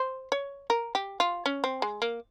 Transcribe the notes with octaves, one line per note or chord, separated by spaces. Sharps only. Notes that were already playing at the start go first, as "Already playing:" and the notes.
Already playing: C5
C#5
A#4
G4
F4
C#4
C4
G#3
A#3